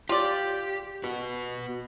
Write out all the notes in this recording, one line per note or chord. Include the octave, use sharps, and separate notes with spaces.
F4 G4 D5
F#4 B4